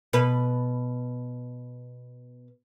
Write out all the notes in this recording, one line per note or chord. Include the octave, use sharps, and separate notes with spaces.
B2 B4